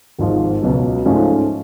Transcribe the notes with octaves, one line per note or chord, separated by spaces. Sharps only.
G#1 G#2 F3
C#2 B2 F#3
G#2 F3 A3 C#4